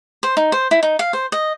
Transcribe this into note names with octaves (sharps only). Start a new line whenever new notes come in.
C5
D#4
C5
E4
D#4
F5
C5
D#5